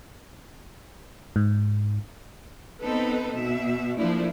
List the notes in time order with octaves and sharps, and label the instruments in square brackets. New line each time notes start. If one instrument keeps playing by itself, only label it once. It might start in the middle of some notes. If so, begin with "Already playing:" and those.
[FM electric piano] G#2
[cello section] B3 C4 D#4 A4 B4
B2 E5
F3 A3 A#3 D4 E4